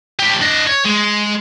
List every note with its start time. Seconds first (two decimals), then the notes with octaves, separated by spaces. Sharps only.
0.19 A2 G4
0.41 D4 D#5
0.67 C#5
0.85 G#3